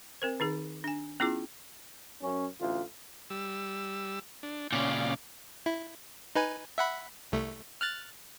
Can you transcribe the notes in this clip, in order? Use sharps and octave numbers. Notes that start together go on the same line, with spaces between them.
C4 A#4 C5
D#3 D#4 G#4
D4 G#5
B3 C#4 E4 F4 G#4 D6
F#2 C#4
A1 D2 F4
G3 E6
D4
A#2 C#3 C#4 D5 F5
E4
D#4 B4 G#5
E5 F#5 B5
C2 A3
F6 F#6 A6